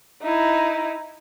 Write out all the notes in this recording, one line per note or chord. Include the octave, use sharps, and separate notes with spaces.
D#4 E4